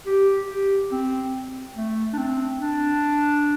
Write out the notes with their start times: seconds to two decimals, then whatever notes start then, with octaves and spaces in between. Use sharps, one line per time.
0.06 G4
0.50 G4
0.92 C4
1.76 A3
2.13 D4
2.18 C4
2.61 D4